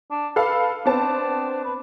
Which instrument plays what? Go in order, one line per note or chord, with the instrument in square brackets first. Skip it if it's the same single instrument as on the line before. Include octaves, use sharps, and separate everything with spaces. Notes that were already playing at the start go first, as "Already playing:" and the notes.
[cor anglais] D4
[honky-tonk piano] A4 F5 [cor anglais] B4
[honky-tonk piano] B3 C4 A5 [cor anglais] D4
[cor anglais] B4